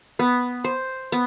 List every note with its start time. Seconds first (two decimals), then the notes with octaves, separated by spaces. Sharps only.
0.19 B3
0.64 C5
1.12 B3